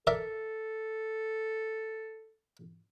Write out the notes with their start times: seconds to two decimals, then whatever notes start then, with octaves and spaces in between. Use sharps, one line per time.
0.07 A4 A#4 D5 E5